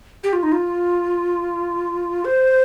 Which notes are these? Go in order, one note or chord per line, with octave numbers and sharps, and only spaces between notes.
G4
F4
D#4
F4
C5